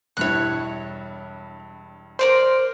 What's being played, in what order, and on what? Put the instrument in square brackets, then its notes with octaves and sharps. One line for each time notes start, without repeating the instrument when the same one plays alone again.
[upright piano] E1 G2 E4 [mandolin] C#5 F#6
[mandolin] A#4 D5 C6 [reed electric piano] C5